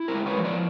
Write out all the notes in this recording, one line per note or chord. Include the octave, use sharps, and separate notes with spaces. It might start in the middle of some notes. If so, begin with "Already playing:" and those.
Already playing: E4
A#4 C5
G#3
B4 C#5
F3
C5 D5